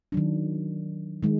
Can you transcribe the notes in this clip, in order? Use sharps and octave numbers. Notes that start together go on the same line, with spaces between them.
D#3 F#3 D4
D#3 G#3